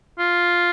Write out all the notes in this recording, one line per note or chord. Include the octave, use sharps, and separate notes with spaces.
F4